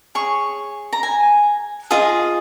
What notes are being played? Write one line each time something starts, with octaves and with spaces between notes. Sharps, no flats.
G#4 C#5 C#6
A#5
G#5
F4 G#4 D#5